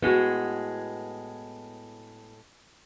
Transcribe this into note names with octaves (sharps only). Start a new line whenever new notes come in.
A2 G#3 B3 F#4